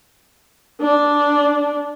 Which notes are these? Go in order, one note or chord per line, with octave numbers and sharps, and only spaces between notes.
D4